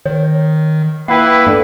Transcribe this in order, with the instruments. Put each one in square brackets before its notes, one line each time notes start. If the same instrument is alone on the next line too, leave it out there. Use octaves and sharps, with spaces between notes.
[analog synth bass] D#3 [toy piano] C#5
[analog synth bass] A#3 [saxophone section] E4 B4 [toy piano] F#5 G5
[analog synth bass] G2 [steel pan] A3 D4